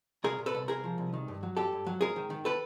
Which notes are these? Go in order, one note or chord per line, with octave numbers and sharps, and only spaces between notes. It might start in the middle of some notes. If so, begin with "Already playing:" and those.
C2 G#4 A#4
A#2
A4 B4
C2
C2 G#4 A#4
F3
C2
D#3
G2
F#3
G2 G4 A4
G2
F#3
G#2 G#4 A#4
D#3
D#3
A4 B4